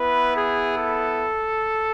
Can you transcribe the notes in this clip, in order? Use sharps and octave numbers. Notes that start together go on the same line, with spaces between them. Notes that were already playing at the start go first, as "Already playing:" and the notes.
Already playing: B3 E4 B4
G#4
A4